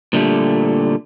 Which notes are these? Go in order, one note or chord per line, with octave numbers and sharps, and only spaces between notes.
A#2 D3 G3 A3